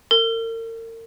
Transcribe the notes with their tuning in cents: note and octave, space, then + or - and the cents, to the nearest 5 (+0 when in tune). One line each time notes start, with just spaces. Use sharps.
A#4 -40